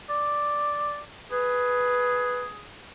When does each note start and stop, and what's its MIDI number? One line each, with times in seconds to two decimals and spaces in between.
0.09 0.98 74
1.32 2.67 68
1.32 2.43 71